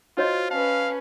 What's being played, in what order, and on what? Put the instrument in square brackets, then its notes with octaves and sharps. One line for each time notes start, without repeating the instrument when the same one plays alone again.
[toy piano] D#4 C#5 D#5 [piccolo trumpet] F4 [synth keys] F#4 C5 C6
[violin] C#4 B4 [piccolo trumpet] F5 [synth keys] A5